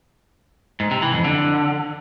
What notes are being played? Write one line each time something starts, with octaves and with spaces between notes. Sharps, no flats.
G#2
C3
E3
F2
D3